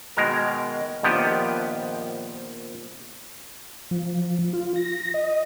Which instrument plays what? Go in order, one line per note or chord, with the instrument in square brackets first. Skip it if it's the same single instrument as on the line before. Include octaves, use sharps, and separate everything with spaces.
[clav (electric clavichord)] B2 D#3 G#3 A#4
A#1 D#3 F3 B3 G4
[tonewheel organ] F3
F4
A#6
D#5